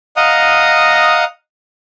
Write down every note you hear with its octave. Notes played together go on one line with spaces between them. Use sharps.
D#5 F5 F#5 A#5 D#6